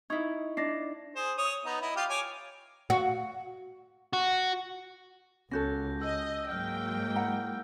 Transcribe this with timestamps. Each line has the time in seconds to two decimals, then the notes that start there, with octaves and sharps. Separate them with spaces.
0.10 D#4 E4 C#6 G#6
0.57 D4 D#5 A#6 C7
1.16 G#4 C5
1.37 C#5 D#6
1.65 B3 D#4
1.81 E4 D#5
1.96 F4 G4 F5
2.09 C#5 G#5 D6
2.90 F#4
4.13 F#4
5.51 C#2 C#4 F#4 A4 G6 A#6
6.02 D#5 E6
6.49 G#2 F#3 G#3 A#3 G5 F6 G6
7.16 E4 F#5 A#5